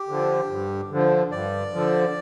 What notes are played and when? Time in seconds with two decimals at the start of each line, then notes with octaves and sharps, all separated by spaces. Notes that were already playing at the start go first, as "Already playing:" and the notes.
Already playing: G4
0.08 D3 F3
0.48 G2
0.90 D3 F3
1.31 G2 D5
1.73 D3 F3